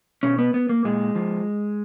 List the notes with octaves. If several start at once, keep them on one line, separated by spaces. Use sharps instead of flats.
B2 C#4
B3
B3
A#3
A#2 G#3
F3